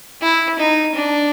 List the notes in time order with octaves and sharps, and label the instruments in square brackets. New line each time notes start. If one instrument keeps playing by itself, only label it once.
[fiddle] E4
D#4
D4